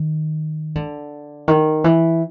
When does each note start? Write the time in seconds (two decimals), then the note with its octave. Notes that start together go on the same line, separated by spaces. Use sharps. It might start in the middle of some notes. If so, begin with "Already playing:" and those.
Already playing: D#3
0.75 D3
1.48 D#3
1.84 E3